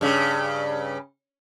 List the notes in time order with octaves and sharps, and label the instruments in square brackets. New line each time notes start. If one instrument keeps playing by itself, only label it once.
[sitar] G2 C#3